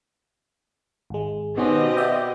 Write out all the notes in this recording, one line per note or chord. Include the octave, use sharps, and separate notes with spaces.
G#1 G#3
B2 D#3 C4 C#4 G4 D#5
D5 E5 G5